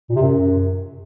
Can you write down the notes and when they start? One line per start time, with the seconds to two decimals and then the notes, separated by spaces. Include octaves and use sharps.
0.10 A#2
0.16 C3
0.22 F#2